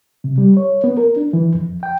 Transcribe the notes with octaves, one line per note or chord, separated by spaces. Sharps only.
C3
G3
C#5
B3
A#4
D4
E3
F2
G5